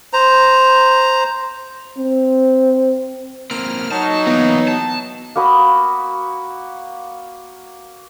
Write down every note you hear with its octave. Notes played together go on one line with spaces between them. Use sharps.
C5 A#5
C4
A#3 C4 F6
F#3 D#4 A5
E3 A#3 B3
A5
A#3 F#4 B5 D#6